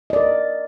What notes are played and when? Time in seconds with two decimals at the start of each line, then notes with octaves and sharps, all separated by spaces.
0.10 D#5
0.13 D5
0.16 A#4